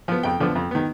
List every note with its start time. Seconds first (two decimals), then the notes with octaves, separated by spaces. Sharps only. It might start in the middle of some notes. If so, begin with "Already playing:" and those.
0.08 F3 B3
0.23 F2 G5
0.40 D3 F3 B3
0.55 F2
0.71 D#3 B3